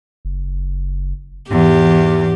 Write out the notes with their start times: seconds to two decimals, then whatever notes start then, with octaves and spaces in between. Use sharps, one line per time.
0.25 F#1
1.50 E2 G#2 G4